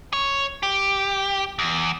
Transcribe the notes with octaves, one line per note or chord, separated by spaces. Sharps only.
C#5
G4
E2